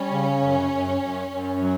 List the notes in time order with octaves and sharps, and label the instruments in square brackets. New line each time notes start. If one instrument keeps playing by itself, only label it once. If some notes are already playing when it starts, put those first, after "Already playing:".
Already playing: [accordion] G3 [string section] C#4
[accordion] C#3
F#2
F#2
F#2
F#2
F#3